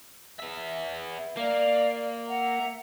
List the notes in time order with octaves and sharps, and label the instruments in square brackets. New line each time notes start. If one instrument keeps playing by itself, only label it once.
[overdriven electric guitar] B3 E5
[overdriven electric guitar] A#3 [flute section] D5 F5
[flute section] E5 F#5 A#5